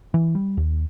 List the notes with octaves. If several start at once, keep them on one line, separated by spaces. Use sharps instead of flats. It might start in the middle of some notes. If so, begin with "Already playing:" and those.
E3
G3
D#2